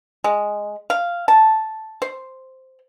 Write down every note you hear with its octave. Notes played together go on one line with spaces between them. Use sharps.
G#3
F5
A5
C5